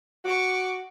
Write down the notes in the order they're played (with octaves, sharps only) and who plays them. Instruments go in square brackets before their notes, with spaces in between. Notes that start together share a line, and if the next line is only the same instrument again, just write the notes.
[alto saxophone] F#4 [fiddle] C#6 D6